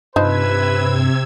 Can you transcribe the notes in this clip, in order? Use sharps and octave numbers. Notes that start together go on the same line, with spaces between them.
G2 C3 F3 D#4 B4 C5 E6 G#6